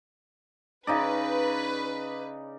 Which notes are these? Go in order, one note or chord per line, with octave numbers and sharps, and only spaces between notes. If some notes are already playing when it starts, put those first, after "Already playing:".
C#3 D#4 B4 D5